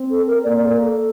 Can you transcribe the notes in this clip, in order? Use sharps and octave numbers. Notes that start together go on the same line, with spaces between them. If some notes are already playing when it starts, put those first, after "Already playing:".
Already playing: C4
A4
A#4
A#3 D5
D5
A4
A#4
A4